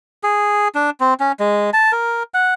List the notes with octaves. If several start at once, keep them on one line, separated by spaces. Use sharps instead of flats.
G#4
D4
C4
C#4
G#3
A5
A#4
F#5